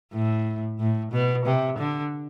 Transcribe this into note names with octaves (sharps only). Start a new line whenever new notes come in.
A2
A2
B2
C3
D3